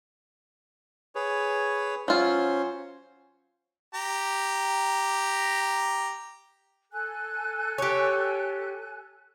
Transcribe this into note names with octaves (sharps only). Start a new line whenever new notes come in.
G#4 B4 C#5
F#3 C#4 F4 C5
G4 A#5
A4 G#5 F#6
G4 C#5